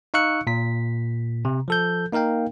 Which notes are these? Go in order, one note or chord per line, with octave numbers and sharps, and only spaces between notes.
D#4 F5 C#6 E6 F#6 C#7
A#2 B6
C3
F3 A4 G6
A#3 D#4 A#4 F5 G5